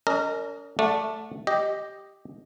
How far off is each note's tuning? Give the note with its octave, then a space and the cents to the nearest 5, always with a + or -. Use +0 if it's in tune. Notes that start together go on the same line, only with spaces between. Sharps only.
C#4 +45 A#4 -25 D#5 +0
A3 +0 D5 +0 F#5 -35
G4 +0 D#5 +0